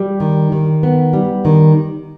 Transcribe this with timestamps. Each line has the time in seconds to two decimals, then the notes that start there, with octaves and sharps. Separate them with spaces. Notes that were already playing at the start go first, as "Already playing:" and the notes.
Already playing: G3
0.20 D#3
0.52 D#3
0.83 B3
1.13 G3
1.45 D#3